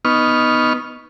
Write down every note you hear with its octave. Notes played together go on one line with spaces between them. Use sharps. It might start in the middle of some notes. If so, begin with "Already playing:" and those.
B3 D#4 C#6 F6